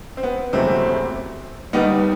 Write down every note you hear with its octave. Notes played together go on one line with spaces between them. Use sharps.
C4
B3
F#1 E2 C3 F#3 A3 C4
D#2 D#3 G3 B3 D#4